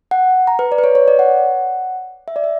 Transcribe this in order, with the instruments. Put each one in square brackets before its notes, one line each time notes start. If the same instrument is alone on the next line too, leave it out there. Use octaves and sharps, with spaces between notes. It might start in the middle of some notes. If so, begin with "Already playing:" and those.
[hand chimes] F#5
A#5
B4
D5
B4
C#5
C#5
D5
F#5
E5
D5
E5